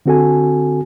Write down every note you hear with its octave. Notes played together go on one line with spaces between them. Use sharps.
D3 C4 F#4 A4 G#5